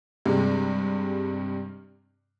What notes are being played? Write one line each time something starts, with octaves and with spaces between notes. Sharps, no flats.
G2 C3 G#3